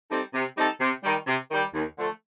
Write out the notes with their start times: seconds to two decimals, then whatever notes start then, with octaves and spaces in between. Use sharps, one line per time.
0.11 G3 C4 D#4 A4
0.34 C3
0.57 G3 C4 D#4 A4
0.80 C3
1.04 D#3 G3
1.27 C3
1.50 D#3 G3
1.73 D#2
1.96 D3 F3 A3